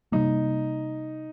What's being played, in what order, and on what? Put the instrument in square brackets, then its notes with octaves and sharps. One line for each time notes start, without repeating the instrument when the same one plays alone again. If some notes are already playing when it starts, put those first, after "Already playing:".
[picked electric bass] C3 G3 A#3 [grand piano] D#4